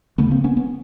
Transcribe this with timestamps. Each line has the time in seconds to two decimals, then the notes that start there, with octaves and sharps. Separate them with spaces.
0.18 D2 C#3 A3 B3
0.31 A#3 C4
0.44 B3 C#4
0.57 B3 C#4